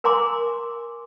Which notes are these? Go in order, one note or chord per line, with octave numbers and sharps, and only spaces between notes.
A#4 G#5 A#5 C6 D6